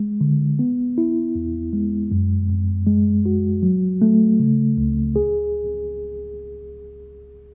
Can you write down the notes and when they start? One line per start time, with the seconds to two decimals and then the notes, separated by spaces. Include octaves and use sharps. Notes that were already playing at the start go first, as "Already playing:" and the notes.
Already playing: G#3
0.21 D3
0.59 B3
0.98 E4
1.35 E2
1.73 G#3
2.11 F#2
2.50 F#2
2.87 G#3
3.26 F#4
3.63 F#3
4.02 A3
4.40 C#3
4.77 C#2
5.16 G#4